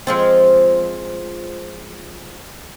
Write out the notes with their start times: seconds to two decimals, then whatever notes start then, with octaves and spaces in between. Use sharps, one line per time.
0.07 F3 G#3 C4